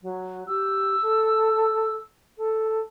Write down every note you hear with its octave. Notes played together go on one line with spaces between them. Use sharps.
F#3
G4 E6
A4
A4